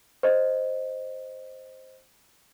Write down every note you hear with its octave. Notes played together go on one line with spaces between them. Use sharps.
C5 D#5